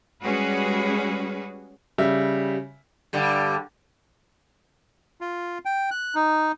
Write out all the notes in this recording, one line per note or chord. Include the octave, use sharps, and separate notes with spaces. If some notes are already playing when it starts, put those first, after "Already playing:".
G3 G#3 C#4 F#4 G#4 B4
C#3 G3 E5
G2 D3 G3
F4
G5
F#6
D#4